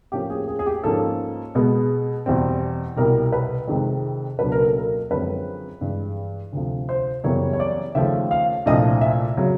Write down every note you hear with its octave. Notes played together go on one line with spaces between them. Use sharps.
A2 F3 A#3 C#4 G4
G#4
G#4
G#4
G4
G#2 F3 A#3 C#4 A4
B2 G#3 B3
E2 B2 G3 C4
C2 B2 G3 A#4
B4
F2 C3 D#3 G#3
C#2 B2 F#3 A#3 D4 B4
A#4
A4
A#4
F#2 D3 F3 G#3 C4 B4
G2 E3 G#3
D2 C3 F3
C5
F#2 C#3 E3 G3 B3 C#5
C#5
D5
D#2 C#3 F3 A3 E5
F5
C2 A#2 F3 A3 D4 D#5
E5
C#3 F#3